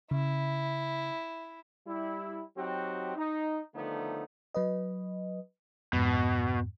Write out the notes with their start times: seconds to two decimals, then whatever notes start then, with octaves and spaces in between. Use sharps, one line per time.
0.11 C#3 E4
1.87 G3 E4
2.56 F#3 C4 D#4 F#4 G4
3.16 D#4
3.75 D3 D#3 F3 A3 B3 D#4
4.55 F#3 B4 D#5
5.93 F2 G#2 B2